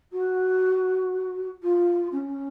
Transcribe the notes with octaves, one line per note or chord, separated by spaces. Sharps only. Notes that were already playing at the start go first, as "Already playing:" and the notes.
F#4
F4
C#4